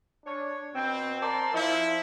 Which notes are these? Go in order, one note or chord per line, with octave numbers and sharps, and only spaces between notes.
D4 C#5
B2 C4
A#4 C5 D5 A5 C6
F3 E4